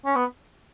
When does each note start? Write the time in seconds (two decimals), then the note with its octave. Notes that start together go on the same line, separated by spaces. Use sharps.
0.05 C#4
0.15 B3